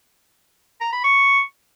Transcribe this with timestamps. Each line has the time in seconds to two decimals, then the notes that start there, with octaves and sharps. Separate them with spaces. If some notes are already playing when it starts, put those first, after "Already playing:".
0.81 A#5
0.92 B5
1.04 C#6